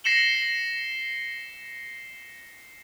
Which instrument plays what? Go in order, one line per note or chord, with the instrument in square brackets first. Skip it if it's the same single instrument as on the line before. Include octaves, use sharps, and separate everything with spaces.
[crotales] A#6 C7 C#7 E7 F#7 G7